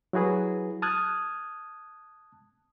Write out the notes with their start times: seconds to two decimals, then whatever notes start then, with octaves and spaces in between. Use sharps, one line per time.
0.13 F#3 E4 F#4 G#4 B4
0.82 A5 D#6 F6 F#6 G#6